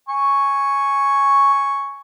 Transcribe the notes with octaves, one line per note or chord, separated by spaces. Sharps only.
G#5 C#6